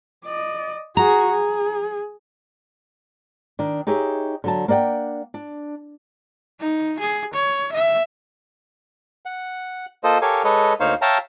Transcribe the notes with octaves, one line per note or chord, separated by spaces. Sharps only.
D5 D#5
F#4 G#4 A#5
G#4
D#3 D4
D#4 G4 G#4 C#5 E5
D3 F#3 A5
A#3 D4 D5 F#5 G5
D4
D#4
G#4
C#5
E5
F#5
A#3 F4 A4 C5 D#5
G4 A4 A#4 C#5 F5 G#5
G#3 A4 B4 C#5 D#5
D2 A#3 D#4 C5 C#5 F5
C#5 E5 F5 G5 A5 A#5